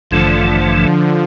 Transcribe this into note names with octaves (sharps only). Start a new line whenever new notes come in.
A1 G2 D3 E3 F3 A3